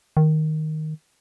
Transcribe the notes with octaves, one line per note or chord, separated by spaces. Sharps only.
D#3